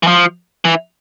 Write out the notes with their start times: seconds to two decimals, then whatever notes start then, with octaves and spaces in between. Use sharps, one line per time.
0.03 E3
0.07 F3
0.65 E3